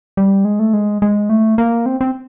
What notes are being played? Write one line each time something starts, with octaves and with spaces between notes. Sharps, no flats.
G3
G#3
A3
G#3
G#3
A3
A#3
C4
C4